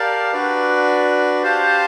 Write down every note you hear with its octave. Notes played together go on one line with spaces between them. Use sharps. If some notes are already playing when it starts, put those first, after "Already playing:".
Already playing: G4 A#4 D5 F5 A5
D4 F#4 B4 D5
G4 C5 F5 A5